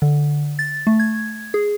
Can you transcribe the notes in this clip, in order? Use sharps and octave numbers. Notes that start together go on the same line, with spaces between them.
D3
A6
A3
G#6
G#4